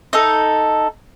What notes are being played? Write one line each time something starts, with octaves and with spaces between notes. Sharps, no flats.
D#4 A4